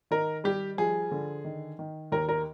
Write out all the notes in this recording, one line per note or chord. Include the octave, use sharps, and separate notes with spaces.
D#3 A#4
G3 G4
F3 G#4
D3
D#3
D#3
D#2 A#4
A#4